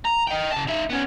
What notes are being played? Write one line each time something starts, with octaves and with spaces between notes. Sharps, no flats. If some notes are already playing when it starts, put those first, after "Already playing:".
A#5
D#5 G5
C#3 A5
D#4 E5
B3 C#4